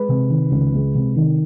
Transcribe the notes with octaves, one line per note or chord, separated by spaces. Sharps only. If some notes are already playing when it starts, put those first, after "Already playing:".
Already playing: G#3 B4
C3
D#3
C#2
G#3
C3
D#3